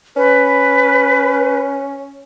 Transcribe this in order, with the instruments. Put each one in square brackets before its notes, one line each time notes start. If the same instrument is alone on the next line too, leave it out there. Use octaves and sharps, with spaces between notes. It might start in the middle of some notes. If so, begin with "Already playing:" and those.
[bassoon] C#4 [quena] B4